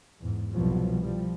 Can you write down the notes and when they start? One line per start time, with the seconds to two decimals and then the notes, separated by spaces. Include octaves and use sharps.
0.20 E2 G#2
0.52 C2 B2 F3 F#3
1.01 F3 G3